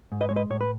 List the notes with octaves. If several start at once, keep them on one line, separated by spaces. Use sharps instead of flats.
G#2
B4 D#5
G#3 C#5
B4 D#5
A2 C#5
B4